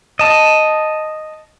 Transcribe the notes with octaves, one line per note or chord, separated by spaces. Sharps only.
D#5 A5